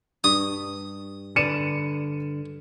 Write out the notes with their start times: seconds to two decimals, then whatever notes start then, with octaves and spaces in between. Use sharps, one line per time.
0.24 G2 D#6
1.36 D3 B4 D5 C#7 D#7 E7